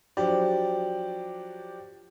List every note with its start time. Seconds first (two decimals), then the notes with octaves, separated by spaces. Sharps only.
0.17 F3 F#3 D4 G4 D5